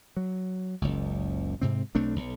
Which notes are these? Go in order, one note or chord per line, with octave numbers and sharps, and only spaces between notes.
F#3
F#1 C#2
G#2 C3 C4
B1 A3 C4 D4
B1